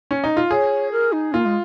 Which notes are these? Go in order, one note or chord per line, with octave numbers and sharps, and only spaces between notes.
C#4
D#4
F4
G#4 C#5
A#4
D#4
A#3 F4
G#3